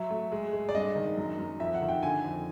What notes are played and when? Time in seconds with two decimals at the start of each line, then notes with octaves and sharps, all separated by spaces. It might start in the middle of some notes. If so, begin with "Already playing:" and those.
Already playing: F#3 E5
0.10 A3
0.32 G#3
0.53 G#3
0.69 D5
0.75 G2 D#5
0.96 D#3
1.17 F#2
1.39 F#2
1.60 F2 E5
1.74 F#5
1.82 D#3
1.89 G5
2.03 D3 G#5
2.24 F2